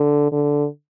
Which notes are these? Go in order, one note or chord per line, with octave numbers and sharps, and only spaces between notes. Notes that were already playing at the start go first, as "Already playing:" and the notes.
Already playing: D3
D3